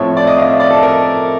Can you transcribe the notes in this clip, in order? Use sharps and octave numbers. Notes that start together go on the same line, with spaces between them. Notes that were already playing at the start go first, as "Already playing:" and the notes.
Already playing: A2 F3 A3 C4 C#5
D5
D#5
F5
E5
D5
A4
A#4